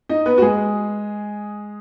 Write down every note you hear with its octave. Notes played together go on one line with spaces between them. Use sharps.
D#4 D#5
B3 B4
F#4
G#3 G#4